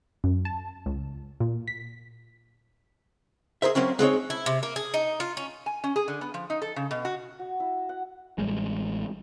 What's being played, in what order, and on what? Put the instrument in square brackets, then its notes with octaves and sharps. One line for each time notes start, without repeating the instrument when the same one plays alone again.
[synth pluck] F#2
A5
C#2
A#2
B6
[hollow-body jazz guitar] G#4 A#4 C5 E5
F#3 A#3 C4 C#4
G#3 C4 D#4 C#5
[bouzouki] E4
C3
A#3
G#4
D#4
F4
C#4
[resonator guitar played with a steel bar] G#5
C#4
G#4
D3
B3
F3
D#4
A4
C#3
B2
F#4
[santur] F#4
E4
F#5
[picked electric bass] A1 G3 G#3